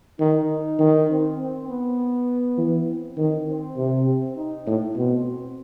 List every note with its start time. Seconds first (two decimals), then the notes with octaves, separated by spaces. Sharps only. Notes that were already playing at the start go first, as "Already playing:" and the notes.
0.20 D#3 D#4
0.79 D#3
1.09 C4
1.39 C4
1.69 B3
2.58 E3
2.88 C4
3.17 D#3
3.47 C4
3.77 C3
4.07 C4
4.36 D#4
4.67 A2
4.96 B2 C4